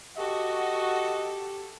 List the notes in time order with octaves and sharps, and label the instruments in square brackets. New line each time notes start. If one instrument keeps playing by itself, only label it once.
[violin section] F#4 [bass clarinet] G4 [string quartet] A4 [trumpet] D#5